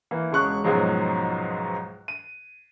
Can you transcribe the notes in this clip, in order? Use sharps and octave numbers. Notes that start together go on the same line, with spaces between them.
E3 A#3
E1 C#3 G#3 C#6 F#6
C#2 G#2 B2 F3 F#3 G#3
D#7